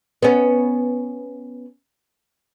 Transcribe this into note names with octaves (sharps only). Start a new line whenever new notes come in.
B3 C#4